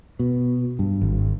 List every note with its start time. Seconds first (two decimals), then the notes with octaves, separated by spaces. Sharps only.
0.19 B2
0.79 G2
1.02 G#1